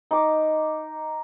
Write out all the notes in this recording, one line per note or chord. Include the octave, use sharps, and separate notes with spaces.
D#4 D6